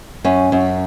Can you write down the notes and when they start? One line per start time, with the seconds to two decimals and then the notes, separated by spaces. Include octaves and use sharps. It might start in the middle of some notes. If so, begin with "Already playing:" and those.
0.24 F#2 C#4
0.52 F#2